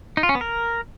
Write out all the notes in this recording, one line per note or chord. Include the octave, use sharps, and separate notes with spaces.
D#4
F4
C#4
B3
A#4